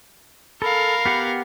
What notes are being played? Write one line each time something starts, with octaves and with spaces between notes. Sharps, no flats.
A4 A#4 F5 B5
B3 G4 F#5